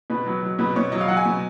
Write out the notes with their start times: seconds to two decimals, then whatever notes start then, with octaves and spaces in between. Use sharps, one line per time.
0.10 B2 B4
0.27 F#3
0.43 F#3
0.59 B2 B4
0.76 B2 C#5
0.92 F#3 D#5
1.01 F5
1.08 F#3 F#5
1.17 G#5
1.25 B2